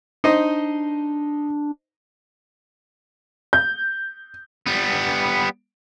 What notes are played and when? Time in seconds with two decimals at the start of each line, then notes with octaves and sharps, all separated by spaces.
0.24 D4 D#4 C5 D#5
3.53 G6
4.66 G3 B3